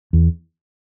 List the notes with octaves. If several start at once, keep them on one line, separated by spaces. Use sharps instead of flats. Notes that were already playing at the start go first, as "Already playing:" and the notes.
E2